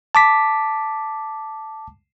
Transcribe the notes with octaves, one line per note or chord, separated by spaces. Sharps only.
A5 D6 B6